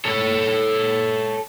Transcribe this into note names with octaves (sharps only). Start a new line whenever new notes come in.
A4 C#5